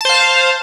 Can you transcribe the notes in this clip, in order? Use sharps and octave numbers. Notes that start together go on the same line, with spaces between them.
C5 F5 A5